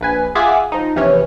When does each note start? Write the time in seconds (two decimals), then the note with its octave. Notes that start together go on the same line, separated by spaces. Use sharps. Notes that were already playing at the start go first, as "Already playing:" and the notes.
0.01 A#1 B4 G#5
0.35 F4 G#4 E5 F#5 G#5 D6
0.72 F3 D#4
0.96 A#1 C3 E3 C#4 C#5